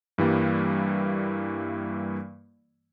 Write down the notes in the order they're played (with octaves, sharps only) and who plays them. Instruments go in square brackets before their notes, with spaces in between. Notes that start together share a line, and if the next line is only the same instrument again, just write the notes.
[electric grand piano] G2 E3 G3 A#3